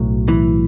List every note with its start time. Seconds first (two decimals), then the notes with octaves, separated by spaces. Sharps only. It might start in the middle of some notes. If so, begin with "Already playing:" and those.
Already playing: B1 A2 F#3
0.28 E3